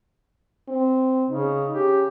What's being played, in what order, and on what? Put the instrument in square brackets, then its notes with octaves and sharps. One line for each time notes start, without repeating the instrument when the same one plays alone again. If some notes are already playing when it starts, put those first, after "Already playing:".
[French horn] C4
[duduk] C#3 [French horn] D#4
[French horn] C#3 [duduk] G4